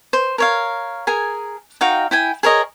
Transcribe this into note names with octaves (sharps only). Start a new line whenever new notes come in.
C5
A#4 C#5 F5
G#4 A#4 G#5
D#4 F#4 F5 G5
E4 G5 G#5
G#4 A#4 C#5 D#5